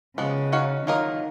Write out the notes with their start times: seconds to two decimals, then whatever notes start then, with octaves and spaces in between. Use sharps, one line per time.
0.18 C#3 F3 G#3 B3 F#4
0.52 D#4 F#4 C#5 F5
0.86 D#3 F#3 A#3 F4 A#4 D#5